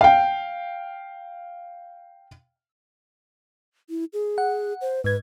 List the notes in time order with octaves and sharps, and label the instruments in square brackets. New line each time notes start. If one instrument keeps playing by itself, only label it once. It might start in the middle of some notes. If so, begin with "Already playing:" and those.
[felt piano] F5 G5
[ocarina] E4
G#4
[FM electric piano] F#5
[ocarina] C5
[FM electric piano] G#2 G#6 [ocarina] B4